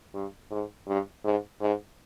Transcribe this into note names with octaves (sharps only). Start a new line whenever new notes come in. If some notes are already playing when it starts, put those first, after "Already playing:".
G2
G#2
G2
G#2
G#2